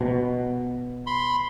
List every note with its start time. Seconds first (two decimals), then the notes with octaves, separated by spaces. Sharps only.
0.01 B2
1.07 B5 C6